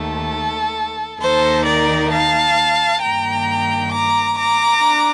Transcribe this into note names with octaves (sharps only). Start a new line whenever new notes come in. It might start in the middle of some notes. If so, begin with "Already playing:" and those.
Already playing: D#2 D#3 A3 A4
D#2 D#3 A#3 D#4 A4 C5
A#4 D5
F5 A5
G2 D#3 A#3 G5 A#5
A#5 D6
A#5 D6
D4